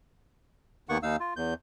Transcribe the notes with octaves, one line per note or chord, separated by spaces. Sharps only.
D#2 D#3 A#3 B3 F#5 C#6
D#2 D#4 F5 E6
F4
E2 G6